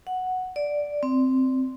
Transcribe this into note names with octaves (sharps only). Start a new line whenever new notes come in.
F#5
D5
C4